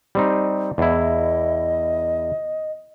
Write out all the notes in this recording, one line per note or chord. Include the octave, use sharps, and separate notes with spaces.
G3 C4 D#4
E2 E4 D#5